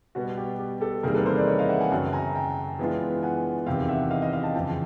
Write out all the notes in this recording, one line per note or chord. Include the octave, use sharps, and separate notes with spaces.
B2 G3 B3 F#4
G4
G4
G4 A4
E2 C3 D#3 G3 A#3 G#4 A#4
A4 B4
A#4 C5
C5 D5
C#5 D#5
D#5 F5
E5 F#5
F#5 G#5
F#2 C#3 F#3 G5 A5
G#5 A#5
G5 A5
E3 G#3 B3 D4 F4
F#5 G#5
E2 C3 D#3 F5 G5
E5 F#5
D#5 F5
D#5 F5
D#5 F5
G5 A5
E2 C#3 F3 G5 A5